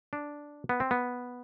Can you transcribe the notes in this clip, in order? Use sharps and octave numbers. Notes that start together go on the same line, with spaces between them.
D4
B3
C4
B3